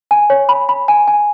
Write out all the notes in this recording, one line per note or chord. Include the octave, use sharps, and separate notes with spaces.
G#5
C#5
B5
B5
G#5
G#5